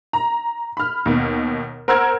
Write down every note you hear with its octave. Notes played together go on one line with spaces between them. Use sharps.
A#5
B5 F6
D#2 B2
A#4 C5 F#5 E6 F6 G#6